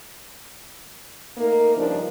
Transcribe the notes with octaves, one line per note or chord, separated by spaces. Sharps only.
A3 A#3 D#4 A#4
G2 C#3 F3 D4 D#4